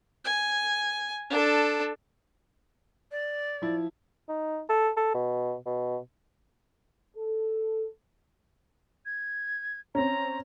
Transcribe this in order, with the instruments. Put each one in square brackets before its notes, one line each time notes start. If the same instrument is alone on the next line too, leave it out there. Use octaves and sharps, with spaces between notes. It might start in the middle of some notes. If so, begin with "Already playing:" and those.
[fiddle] G#5
D4 A4
[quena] D5
[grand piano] F3 E4
[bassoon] D#4
A4
A4
B2
B2
[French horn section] A4
[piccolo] G#6
[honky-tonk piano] C4 C#4 [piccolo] A#5